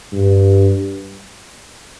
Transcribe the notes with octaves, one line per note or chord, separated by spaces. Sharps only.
G2